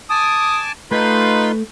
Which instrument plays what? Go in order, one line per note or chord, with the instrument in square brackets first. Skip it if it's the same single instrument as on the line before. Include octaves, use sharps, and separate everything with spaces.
[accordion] G#5 A5 D6 [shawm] D#6
[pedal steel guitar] A3 G5 [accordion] D#4 F4 C6 [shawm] B4